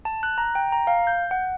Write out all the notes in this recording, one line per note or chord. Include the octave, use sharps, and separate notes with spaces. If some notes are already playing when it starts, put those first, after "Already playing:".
A5
F#6
A#5
G5
A#5
F5
G6
F#5